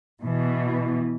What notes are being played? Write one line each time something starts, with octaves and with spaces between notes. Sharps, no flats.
B2 E3